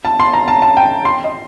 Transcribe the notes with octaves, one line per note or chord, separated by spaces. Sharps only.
A5
C6
A#5
A5
A5
G5
C6
D#5